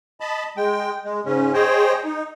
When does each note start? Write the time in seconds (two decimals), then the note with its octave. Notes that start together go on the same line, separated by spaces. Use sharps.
0.20 D#5 A5 B5
0.57 G#3 G5
1.05 G#3
1.25 G#2 C#3 C#4
1.54 G#4 C5 C#5 D#5 G5
2.05 D#4